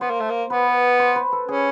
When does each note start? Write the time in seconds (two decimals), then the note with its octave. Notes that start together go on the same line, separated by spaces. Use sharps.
0.01 B3 C5
0.10 A#3
0.20 A3
0.30 A#3
0.50 B3 B4
0.99 C5
1.16 B4
1.32 A4
1.48 C#4 G#4